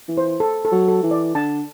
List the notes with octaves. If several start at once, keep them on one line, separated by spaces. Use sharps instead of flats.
E3
C5
A4
A4
F#3
A4
E3
D5
D3 A5